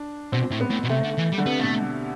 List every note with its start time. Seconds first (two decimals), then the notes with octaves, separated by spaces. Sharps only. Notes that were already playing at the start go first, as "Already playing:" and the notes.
Already playing: D4
0.32 B2 C4
0.52 A2
0.61 B3
0.70 A2
0.84 B2
0.89 C3 A3
1.04 D3
1.18 E3
1.32 G3
1.38 D3
1.46 C3 B3
1.59 B2 A3